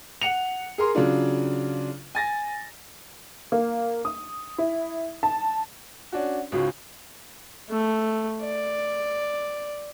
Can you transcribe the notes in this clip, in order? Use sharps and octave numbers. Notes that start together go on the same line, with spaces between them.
F#5 C#7 F7
G#4 A#4 C6
C#3 F#3 D4 F4
G#5 A6 A#6
A#3
D#6
E4
A5
C#4 D4 F#4
C#2 G#2 C#3 F#4
A3
D5